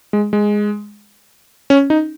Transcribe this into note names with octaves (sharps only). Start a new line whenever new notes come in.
G#3
G#3
C#4
D#4